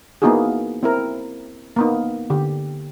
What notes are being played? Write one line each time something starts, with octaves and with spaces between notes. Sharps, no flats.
A#3 B3 D#4 E4 F#4 G#4
C4 E4 A#4
A#3 B3 D#4
D3 G4